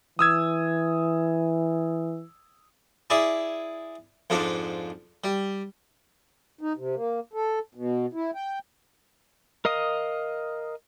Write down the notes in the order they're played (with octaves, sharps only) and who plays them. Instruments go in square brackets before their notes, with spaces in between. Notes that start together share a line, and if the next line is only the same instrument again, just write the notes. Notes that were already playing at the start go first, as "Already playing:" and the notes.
[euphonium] E3 [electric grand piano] D#6 E6 G#6
[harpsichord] E4 G#4 D5 E5
F2 G#2 F3 D4
G3
[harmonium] D#4
C3
A#3
A4
B2
E4
G5
[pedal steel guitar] A#4 D#5 F5 D#6